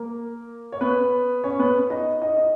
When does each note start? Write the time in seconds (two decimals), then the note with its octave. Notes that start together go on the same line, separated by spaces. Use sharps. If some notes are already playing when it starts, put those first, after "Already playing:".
Already playing: A#3 A#4
0.72 C#5
0.81 B3 B4
1.44 C#4 C#5
1.59 B3 B4
1.90 D#4 D#5
2.21 D#4 D#5
2.36 D#4 D#5